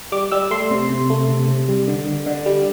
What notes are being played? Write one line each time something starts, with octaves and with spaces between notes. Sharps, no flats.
G3 D6
G3 E6
A3 C6
C3
C3
A3
C3
C3
G3
D3
D3
D3
G3